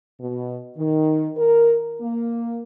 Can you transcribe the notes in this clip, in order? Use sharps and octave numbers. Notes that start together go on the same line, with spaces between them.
B2
D#3
A#4
A#3